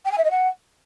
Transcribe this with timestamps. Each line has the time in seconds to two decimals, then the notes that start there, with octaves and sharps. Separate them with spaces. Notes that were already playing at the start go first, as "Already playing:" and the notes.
0.05 G5
0.11 G#5
0.18 E5
0.24 D#5
0.30 F#5